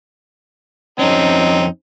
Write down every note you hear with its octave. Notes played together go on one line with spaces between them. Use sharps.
F2 C4 C#4 D#4